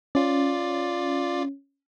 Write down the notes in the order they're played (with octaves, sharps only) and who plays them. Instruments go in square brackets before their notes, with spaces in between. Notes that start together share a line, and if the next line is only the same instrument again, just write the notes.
[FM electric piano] C#4 [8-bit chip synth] F4 D5